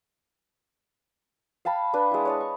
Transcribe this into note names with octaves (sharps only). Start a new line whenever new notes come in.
F5 G5 A5 B5
D4 B4
G#3 E4
C#5 D#5 A5
C#6